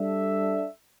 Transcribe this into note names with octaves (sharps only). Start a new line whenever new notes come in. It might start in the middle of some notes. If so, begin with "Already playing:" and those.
Already playing: G3 D4 A4 E5